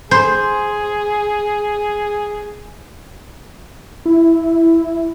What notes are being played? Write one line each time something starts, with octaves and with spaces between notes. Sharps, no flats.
G#4 C5
E4